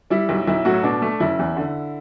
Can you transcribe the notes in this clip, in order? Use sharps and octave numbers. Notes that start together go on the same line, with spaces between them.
G3 E4
B1
B1 E4
A2 F#3 F#4
B2 D4
A3
F#1 E4
E2
D3